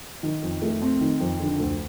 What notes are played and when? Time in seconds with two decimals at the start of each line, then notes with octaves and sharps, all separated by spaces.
0.23 D#3
0.42 F2
0.62 A3
0.82 C4
1.01 D#3
1.20 F2
1.40 D3
1.59 D2